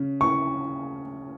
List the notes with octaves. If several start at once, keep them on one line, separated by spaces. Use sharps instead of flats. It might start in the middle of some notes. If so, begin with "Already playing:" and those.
Already playing: C#3
C#6